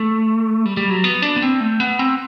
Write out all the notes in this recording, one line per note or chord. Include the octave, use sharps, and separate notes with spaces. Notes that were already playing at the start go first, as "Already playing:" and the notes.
Already playing: A3
G3
G3
F#3
B3
D4
B3
C4
A3
B3
C4